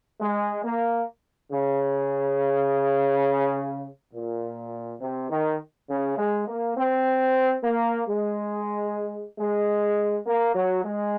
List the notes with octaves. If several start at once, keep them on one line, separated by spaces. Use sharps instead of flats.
G#3
A#3
C#3
A#2
C3
D#3
C#3
G#3
A#3
C4
A#3
G#3
G#3
A#3
F#3
G#3